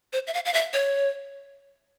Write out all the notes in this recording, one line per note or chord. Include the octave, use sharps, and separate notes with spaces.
C5
E5
F5
F5
E5
C#5